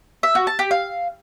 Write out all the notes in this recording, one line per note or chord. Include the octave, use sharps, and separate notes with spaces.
E5
F#4
A5
G4
F5